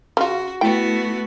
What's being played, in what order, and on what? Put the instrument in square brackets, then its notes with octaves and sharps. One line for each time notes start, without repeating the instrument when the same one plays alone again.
[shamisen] C#3 F4 [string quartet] F#4
[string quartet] A3 B3 F#4 [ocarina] E4 [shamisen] G5